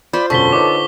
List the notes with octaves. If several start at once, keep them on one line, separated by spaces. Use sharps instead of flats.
F4 C5 D5 B5
E1 F#2 D3 A4 C#6 B6 G7
D#4 B4 C#5 D6